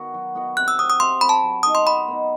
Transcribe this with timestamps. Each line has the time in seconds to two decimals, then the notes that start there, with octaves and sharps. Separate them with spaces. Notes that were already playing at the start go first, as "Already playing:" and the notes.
Already playing: D#3 B3 F#4
0.14 F#3
0.35 B3 F#4
0.57 C3 F#6
0.68 E6
0.78 F#3 C4 D#6
0.90 D#6
1.00 C3 C6
1.21 F#3 C4 B5
1.29 A5
1.43 F#3
1.63 B3 D#4 D#6
1.75 C6
1.86 F#3 B5
2.08 B3 D#4